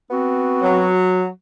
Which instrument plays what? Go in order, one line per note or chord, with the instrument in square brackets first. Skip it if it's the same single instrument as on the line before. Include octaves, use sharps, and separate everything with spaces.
[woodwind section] B3 C4 F#4
[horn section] F#3